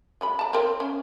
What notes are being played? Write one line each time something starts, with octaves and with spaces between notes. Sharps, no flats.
F#3 G#3 B5
A5 A#5
C4 A#4 C#5
C#4